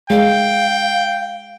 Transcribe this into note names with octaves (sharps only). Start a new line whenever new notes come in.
G#3 F5 G5